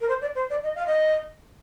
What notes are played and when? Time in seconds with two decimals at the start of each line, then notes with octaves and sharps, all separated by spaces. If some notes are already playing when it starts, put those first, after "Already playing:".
0.01 A#4
0.08 C5
0.21 D5
0.35 C5
0.50 D5
0.63 D#5
0.75 F5
0.86 D#5